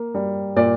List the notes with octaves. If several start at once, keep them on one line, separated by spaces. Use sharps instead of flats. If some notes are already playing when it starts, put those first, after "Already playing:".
Already playing: A#3
G3
A#2 D5